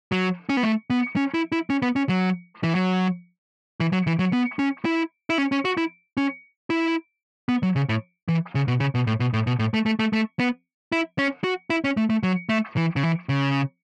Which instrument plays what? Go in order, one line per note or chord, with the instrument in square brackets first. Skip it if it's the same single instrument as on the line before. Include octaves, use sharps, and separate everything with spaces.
[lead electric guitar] F#3
C#4
B3
A3
B3
C#4
E4
E4
C#4
B3
C#4
F#3
E3
F#3
E3
F#3
E3
F#3
B3
C#4
E4
E4
C#4
C#4
F#4
E4
C#4
E4
B3
F#3
C#3
A2
E3
C#3
B2
C#3
B2
A2
B2
A2
B2
A2
A3
A3
A3
A3
B3
E4
C#4
F#4
E4
C#4
A3
A3
F#3
A3
E3
C#3
E3
C#3